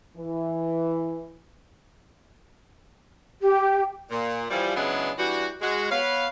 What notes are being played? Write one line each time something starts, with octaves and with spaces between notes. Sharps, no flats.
E3
G4
A#2
E3 F3 G3
C#3 E3 F#3 G#3 B3 D4
E3 G3 D4 F#4
G#3 F#4
B3 B4 C#5 F5